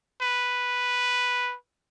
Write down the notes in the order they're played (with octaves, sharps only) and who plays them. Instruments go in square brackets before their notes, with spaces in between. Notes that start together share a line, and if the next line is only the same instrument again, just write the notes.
[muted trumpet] B4